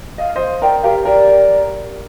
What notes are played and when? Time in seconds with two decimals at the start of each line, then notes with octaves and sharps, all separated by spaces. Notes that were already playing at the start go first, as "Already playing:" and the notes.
0.18 D#5 F5
0.36 C5 D#5
0.62 A#4 D5 G5
0.83 G4 A#4 F5
1.05 G4 A#4 D5